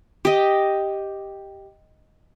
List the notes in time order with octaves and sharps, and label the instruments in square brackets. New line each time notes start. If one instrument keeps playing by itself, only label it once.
[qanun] G4 D#5